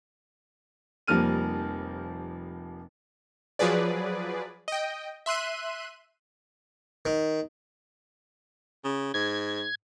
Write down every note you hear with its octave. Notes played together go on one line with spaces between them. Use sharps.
F1 F3 G3 A#3 F6 D#7
F3 F#3 G#4 B4 D5
D#5 G5
E5 C6 F#6 D#7
D#3
C#3
G#2 G#6